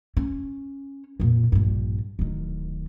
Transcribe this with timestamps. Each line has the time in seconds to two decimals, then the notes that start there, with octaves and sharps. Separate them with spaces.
0.17 C#4
1.20 F2 A#2
1.52 A#1 G2
2.19 D1 D#3